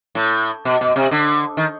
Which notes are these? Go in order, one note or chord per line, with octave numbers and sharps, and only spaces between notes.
A2
B2
B2
C3
D3
D#3